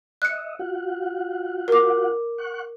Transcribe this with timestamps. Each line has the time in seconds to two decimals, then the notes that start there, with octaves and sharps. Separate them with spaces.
0.22 D#5 E5 F#6 C#7
0.59 F4 F#4 F#5
1.68 A#4 D6
2.38 F#5 C#6 F#6